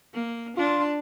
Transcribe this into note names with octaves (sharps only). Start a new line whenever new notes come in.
A#3
D4 F4